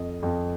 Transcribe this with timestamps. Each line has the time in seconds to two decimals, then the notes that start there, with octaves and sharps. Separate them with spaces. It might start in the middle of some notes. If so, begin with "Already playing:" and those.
Already playing: F2 D#5
0.23 F2